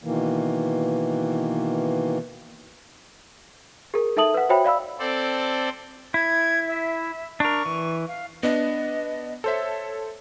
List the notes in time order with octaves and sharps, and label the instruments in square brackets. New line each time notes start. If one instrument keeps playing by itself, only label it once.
[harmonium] B2 D#3 E3 A#3
[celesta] G#4 A#4
D#4 A4 E5 A5 D#6 F#7
B4 F#5
F#4 C5 C#5 E5 G5 B5
D5 F5 B5 E6
[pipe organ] C4 A4 C5 D5
[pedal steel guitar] E4 [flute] G#6
[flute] E5
[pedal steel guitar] D4 A#4 [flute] C#6
[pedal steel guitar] E3
[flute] F5
[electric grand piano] B3 D4 [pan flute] D#5
[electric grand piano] A4 C5 E5 [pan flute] C#5